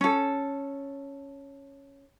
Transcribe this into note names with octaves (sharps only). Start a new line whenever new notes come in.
C#4 A4